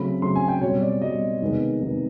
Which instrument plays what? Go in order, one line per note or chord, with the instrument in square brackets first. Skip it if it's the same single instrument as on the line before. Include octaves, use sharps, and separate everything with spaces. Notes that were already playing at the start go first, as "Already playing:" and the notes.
Already playing: [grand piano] C#3 F#3 A3 C4 B5
C#3 F#3 A3 C4 C6
G#5
G5
B2 G3 C4 C#5
D5
B2 G3 C4 D#5
C3 D#3 G#3 B3
C3 D#3 G#3 B3